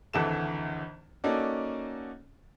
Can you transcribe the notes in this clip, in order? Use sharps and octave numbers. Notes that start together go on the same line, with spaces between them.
G#1 D2 E3 A4 E7
A#3 C#4 D#4 F#4 A4 D5